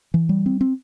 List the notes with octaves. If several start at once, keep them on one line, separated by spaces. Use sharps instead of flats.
E3
G3
C4
C4